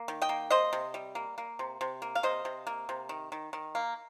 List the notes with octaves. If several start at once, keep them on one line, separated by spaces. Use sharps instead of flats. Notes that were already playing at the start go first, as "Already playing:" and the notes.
Already playing: A#3
D#3
D#5 G5
A#3
C3 C5 D#5
C3
G3
A#3
A#3
C3
C3
A#3
F5
C3 C5 D#5
C3
A#3
C3
D#3
D#3
D#3
A#3